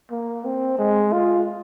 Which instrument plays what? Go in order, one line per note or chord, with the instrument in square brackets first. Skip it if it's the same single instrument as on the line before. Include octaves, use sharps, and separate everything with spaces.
[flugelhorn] A#3
C4
G#3
F4